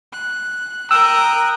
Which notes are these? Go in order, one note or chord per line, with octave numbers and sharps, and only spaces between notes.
F#6
A#4 G5 A#5 D#6 E6 F#6